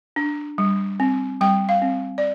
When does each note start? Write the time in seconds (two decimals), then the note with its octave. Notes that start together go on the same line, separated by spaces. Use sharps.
0.16 D4
0.58 G3
1.00 C4
1.41 G3 G5
1.69 F5
1.82 C4
2.18 D5